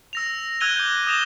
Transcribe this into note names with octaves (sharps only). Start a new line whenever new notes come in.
E6 A#6 F7
E6 F#6 G#6 D#7 F7 G7
D6 G6
D#6 A#6 E7 F7 G7